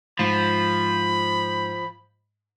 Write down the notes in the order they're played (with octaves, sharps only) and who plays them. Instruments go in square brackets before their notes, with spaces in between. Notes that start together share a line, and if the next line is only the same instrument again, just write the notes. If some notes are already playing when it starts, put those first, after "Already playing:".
[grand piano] G#2 [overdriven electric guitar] F3 [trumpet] B5